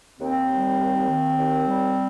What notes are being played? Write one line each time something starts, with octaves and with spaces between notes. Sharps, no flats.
D#2 C4
G3
D#2
D#3
D#2
G3